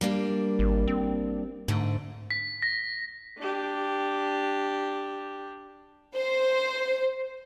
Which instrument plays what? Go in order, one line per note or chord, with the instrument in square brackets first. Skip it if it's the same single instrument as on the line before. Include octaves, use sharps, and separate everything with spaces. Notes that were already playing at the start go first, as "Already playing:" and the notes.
[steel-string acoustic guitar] G3 A#3 D4
[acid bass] G#1
C4
[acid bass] G#2 [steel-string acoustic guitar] D3 A3
[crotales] B6
A#6
[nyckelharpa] D4 G4
[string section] C5